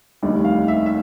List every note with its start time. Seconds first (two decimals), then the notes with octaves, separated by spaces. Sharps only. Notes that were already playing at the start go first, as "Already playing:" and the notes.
0.22 F1 D#2 D#3 G3
0.45 F5
0.68 E5
0.86 E5